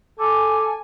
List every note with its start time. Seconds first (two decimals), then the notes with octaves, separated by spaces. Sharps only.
0.19 A4 G#5 D6